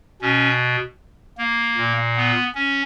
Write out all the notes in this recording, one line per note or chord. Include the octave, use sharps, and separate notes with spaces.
B2 C#4
A#3
A#2
B3
C#4